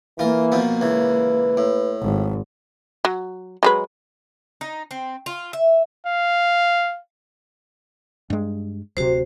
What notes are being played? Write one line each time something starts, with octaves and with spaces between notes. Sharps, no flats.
E3 A#3 F4 A#4
B2 F3 B3
C#2 E3 B4
A2
G#1
F#3
F#3 G#3 B4
D#4
C4
F4
E5
F5
G2 G#3
D1 C3 F#4 C5